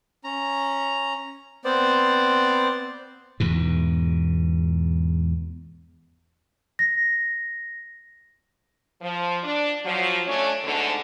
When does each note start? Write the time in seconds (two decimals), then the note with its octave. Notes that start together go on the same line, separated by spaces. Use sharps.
0.24 C#4 A#5
1.65 B3 C4 C5 D5
3.40 E2 G#2 B2
6.79 A#6
9.02 F3
9.43 D4
9.85 F3 F#3
10.26 A3 C#4 D4 C#5
10.64 D2 G#2 B2 D3